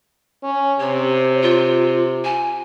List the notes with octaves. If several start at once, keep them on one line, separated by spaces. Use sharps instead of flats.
C#4
C3 C#5
F4
G#5